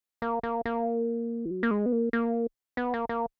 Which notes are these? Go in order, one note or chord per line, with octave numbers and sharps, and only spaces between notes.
A#3
A#3
A#3
E3
F#3
A#3
G#3
B3
A#3
A#3
B3
A#3
A#3